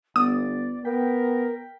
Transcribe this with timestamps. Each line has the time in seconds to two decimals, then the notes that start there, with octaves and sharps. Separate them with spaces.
0.16 G1 B3 D5 D#6
0.85 B3 A#4 G5 G6 B6